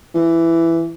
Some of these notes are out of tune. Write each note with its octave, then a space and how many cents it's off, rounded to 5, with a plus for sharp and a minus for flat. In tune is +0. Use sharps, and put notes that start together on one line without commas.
E3 +10